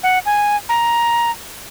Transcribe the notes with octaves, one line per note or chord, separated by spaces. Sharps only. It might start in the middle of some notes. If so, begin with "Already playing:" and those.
F#5
G#5
A#5